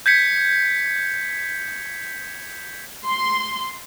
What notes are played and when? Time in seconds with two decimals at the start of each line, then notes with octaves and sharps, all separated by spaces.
0.06 G6 G#6 B6 C#7
3.06 C6